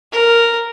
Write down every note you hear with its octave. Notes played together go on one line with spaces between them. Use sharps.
A#4